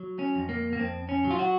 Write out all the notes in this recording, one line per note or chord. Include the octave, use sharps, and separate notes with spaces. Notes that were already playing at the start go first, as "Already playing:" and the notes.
Already playing: F#3
C#4
F2
A#3
A#3
F2 C4
C#4
F#3
F4
F#4